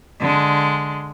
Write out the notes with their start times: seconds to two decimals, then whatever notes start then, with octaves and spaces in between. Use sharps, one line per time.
0.20 D3 G#3